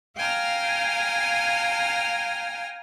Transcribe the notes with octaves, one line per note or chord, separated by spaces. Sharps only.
F5 G5 G#5 A#5 F6